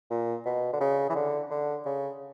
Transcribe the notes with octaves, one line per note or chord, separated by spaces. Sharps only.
A#2
B2
D3
C#3
E3
D3
D3
C#3